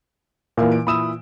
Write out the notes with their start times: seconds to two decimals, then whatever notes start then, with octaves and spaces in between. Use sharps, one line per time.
0.57 A#2 E3 A#3 E4 A#4
0.72 D7
0.87 A#2 E3 B5 D#6 E6 E7